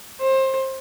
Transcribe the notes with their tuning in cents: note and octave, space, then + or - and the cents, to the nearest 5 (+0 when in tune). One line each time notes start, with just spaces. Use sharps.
C5 +25